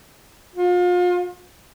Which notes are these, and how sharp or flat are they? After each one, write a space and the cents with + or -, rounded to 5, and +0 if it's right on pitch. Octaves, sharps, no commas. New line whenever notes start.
F4 +35